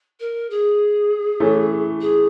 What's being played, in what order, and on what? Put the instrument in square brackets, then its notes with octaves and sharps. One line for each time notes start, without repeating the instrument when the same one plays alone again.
[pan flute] A#4
G#4
[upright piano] E3 A3 C#4
[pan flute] G#4